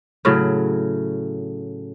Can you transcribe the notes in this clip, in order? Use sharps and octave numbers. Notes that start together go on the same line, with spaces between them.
A2 C#3 F#3